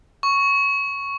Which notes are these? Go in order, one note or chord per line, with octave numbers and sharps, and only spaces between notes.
C#6